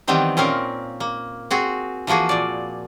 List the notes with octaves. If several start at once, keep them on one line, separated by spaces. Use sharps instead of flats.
D#3 E3 G3 B3 C4 D#4
A#2 C4 C#4 A#4 F5
A#3
C4 F#4 G#4
E3 F3 A#3 F#4 G#4
A#2 D5